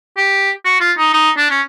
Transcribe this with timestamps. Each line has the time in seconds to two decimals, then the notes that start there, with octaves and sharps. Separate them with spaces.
0.17 G4
0.65 F#4
0.80 F4
0.98 D#4
1.13 D#4
1.37 D4
1.50 C#4